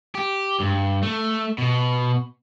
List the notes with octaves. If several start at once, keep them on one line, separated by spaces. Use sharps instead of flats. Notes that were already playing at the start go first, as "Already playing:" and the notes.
G4
G2
A3
B2